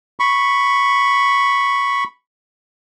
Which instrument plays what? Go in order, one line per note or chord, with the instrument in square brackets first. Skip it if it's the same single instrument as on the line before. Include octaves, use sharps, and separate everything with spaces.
[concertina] B5 C#6